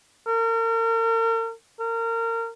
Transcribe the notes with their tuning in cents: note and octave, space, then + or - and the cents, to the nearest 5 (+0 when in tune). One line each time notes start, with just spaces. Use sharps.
A#4 -40
A#4 -30